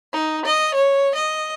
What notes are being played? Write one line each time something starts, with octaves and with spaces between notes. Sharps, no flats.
D#4
D#5
C#5
D#5